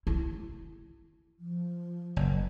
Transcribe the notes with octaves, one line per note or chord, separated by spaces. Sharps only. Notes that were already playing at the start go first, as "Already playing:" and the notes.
E4
F3
F#1